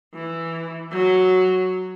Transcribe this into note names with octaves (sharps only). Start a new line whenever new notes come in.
E3
F#3